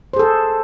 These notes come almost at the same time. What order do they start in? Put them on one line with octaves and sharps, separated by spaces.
C5 G#4 A4